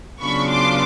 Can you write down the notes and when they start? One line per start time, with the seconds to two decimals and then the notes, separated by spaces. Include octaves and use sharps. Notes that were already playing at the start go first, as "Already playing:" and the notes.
0.21 C#3 F#3 B3 D4 F4 B5 C#6
0.50 C6 D6